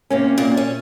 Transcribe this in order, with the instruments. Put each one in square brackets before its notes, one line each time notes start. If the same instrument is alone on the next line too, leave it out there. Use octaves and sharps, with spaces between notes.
[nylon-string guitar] C3 A#3 C#4
[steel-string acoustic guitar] A#2
C#4